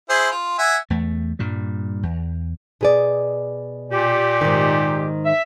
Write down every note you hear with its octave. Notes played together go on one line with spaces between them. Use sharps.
E4 G#4 C5
F4
E5 F#5 G#5
E2 A3
G2 A#2 G3
E2
B2 G#4 D5
A#2 G4
G#2 D#3
E5